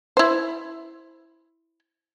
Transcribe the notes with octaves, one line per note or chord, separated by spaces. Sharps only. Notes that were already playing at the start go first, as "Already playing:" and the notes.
E4 C5